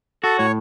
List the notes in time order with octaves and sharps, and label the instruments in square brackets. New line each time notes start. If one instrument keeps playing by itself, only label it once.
[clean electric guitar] F#4 [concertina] A4
[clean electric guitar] A2 [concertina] C#5